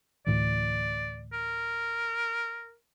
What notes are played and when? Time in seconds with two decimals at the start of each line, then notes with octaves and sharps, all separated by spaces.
0.27 D2 A2 E3 D5
1.33 A#4